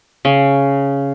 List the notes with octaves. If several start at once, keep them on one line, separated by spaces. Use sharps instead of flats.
C#3